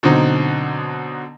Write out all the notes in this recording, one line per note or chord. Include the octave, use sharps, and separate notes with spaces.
B2 D3 F#3 C4 D#4